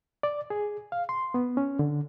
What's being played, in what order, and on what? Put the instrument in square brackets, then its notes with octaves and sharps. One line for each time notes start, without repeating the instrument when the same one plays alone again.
[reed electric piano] D5
G#4
F5
C6
B3
C#4
D3